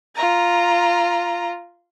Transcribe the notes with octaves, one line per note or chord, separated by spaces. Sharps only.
F4 A#5